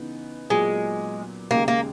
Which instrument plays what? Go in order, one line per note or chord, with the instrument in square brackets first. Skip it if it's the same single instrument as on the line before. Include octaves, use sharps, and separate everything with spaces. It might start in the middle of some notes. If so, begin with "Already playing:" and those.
Already playing: [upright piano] C#3 E3 B3 D#4
[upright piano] A#2 F#3 B3 [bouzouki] G#3
[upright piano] D#2 C#3 G#3 [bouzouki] A#3
[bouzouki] A#3